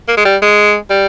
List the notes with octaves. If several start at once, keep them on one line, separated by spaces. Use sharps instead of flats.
A#3
G#3
G3
G#3
G3